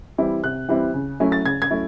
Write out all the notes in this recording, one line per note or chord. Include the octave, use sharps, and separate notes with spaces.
E3 G3 C4 E4
C3 F#6
E3 G3 C4 E4
C#3
F#3 A3 C#4 E4
A6
C#3 G#6
G#6
F#3 A3 C#4 E4